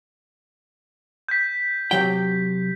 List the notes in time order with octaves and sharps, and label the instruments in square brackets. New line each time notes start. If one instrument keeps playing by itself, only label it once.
[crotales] G6 B6
[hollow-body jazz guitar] C3 F#3 G5